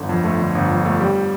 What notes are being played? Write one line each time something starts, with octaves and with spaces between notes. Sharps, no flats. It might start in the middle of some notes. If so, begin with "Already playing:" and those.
Already playing: G1 D3
F2
A3
D3
G1
F2
A3
G3